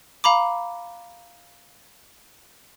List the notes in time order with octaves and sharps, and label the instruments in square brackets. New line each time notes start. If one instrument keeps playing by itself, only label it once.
[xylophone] F5 A#5 B5 D6